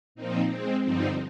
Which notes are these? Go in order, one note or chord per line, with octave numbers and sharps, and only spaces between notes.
A#2 F3 C4 D#4
G#3 C4
G2 D3 F3 C4 D#4